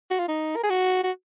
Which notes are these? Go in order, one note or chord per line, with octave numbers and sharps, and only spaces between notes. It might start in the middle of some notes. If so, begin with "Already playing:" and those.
F#4
F4
D#4
A#4
G#4
F#4
F#4